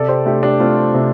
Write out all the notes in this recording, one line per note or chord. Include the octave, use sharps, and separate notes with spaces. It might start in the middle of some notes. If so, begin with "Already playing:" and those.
Already playing: C3 A4 D5
G4 C5
A3 D4 G4
D4 G4
A3 C4 F4
C3